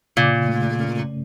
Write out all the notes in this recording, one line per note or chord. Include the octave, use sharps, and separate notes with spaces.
A#2 C#3
A3
C#4